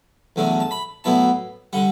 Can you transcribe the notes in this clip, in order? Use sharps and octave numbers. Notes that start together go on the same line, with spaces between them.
E2 D3 F#3 A3 D4
A5
B5
A2 F#3 B3 E4 A5
D3 G3 F#5